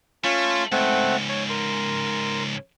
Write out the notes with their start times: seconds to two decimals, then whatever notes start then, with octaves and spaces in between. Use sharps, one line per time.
0.24 A3 C#4 F4 C6
0.72 C#2 G#2 A3 C4 F#5
1.29 C#5
1.50 A#4 C6